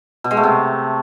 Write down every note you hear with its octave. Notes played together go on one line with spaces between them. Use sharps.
B2
G#3
A3
C3